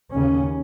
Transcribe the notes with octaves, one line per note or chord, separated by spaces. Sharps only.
D#2 C#3 C#4